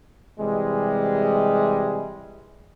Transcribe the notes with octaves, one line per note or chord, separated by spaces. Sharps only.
C3 E3 G3 G#3